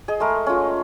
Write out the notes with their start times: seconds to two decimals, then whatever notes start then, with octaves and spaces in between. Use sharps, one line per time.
0.08 G#4 D#5
0.20 G#3 A3 A#4
0.47 C#4 F4